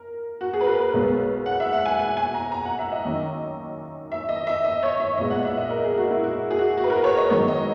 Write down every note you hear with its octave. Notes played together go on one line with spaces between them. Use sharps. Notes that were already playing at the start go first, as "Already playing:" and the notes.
Already playing: A#4
F#4
G#4
B4
A#4
B4
B1 B2 G#3 B3
F#5
E5
F#5
G#5
G#5
G#5
A#5
A#5
F#5
E5
D#5
F#2 D#3 A#3
E5
D#5
E5
D#5
C#5
E5
B1 A#2 G#3 B3 D#5
F#5
E5
D#5
A#4
G#4
F#4
E4
F#4
G#4
F#4
F#4
B4
A#4
C#5
D#5
G#2 D#3 F#3 B3 C#5
D#5